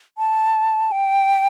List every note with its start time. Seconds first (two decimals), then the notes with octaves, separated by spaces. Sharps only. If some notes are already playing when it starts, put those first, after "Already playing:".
0.18 A5
0.92 G5